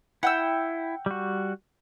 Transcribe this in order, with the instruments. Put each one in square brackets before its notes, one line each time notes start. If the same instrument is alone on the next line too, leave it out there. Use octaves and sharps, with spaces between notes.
[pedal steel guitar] E4 [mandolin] F#5 G5 E6
[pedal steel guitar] G3 F#4